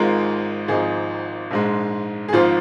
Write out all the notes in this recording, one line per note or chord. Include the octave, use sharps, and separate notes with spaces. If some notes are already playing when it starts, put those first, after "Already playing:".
Already playing: G#1 G#2 G#3 F4 A#4
G#1 G#2 F3 D#4 G#4
A#1 G#2 G#3
G#4
G#1 G#2 F3 F4